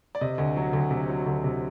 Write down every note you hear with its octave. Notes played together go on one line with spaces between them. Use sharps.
D5
C3 D#5
D2
F#3
D2
C3
F#3
D2
C3